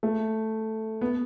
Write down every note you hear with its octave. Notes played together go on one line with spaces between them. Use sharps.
A3
B3